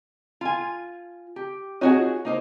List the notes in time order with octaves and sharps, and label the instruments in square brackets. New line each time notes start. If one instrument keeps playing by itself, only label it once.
[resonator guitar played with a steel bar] F4 G#5
G4
[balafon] C4 F4 C#5 [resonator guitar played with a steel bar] D#4 F#4 G#4
[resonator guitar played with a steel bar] A#3 D#4 C5